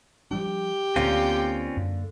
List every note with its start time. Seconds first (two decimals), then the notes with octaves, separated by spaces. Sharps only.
0.31 F3 G3 D4 G4
0.96 D2 D3 A#3 C4 C#4 F4 F5
1.77 F#2